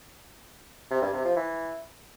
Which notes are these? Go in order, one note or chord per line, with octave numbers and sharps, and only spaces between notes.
C3
G2
C3
F3
E3